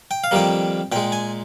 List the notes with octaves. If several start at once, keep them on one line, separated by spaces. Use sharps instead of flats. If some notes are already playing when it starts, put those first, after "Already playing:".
G5
F5
F2 D#3 G3 A#3 G5
A#2 G#3 G5
G#5